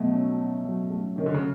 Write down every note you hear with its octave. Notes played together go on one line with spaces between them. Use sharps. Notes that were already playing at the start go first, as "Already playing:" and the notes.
Already playing: B2 F#3 A3
C#4
F#4
F#3
A3
D#3 C#4
D3
C#3